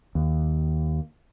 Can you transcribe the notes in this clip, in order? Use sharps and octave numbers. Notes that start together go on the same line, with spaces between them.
D#2